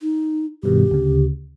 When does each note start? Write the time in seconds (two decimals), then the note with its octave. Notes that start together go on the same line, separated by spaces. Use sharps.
0.01 D#4
0.63 G2 B2 D#3 G4
0.91 D2 C#3